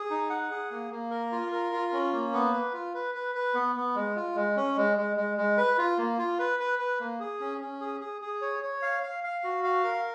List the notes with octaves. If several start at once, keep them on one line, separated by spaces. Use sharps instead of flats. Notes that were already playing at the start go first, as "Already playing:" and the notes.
Already playing: G#4
D#4
F#5
G#4
A#3
A#3
A#4
F4
A#4
F4
C#4
A#3
B3
B4
F4
B4
B4
B4
B3
B3
G#3
F4
G#3
C#4
G#3
G#3
G#3
G#3
B4
F4
A#3
F4
B4
B4
B4
A#3
G#4
C#4
C#4
G#4
G#4
G#4
C#5
C#5
F5
F5
F5
F#4
F5
A#4